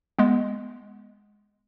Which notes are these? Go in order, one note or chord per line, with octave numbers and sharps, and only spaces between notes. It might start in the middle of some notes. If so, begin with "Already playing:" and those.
G#3 B3